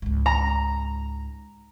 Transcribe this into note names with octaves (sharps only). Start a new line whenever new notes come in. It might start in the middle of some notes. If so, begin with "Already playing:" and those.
C#2 G#2
A#5